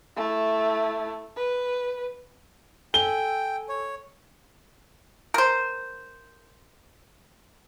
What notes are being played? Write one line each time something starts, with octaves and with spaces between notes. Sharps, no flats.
A3 E4
B4
A4 G5 G#5 G7
C#5
A#4 C5